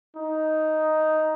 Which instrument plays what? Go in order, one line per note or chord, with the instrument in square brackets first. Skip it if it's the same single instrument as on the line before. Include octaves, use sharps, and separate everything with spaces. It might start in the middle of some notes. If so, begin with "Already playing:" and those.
[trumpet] D#4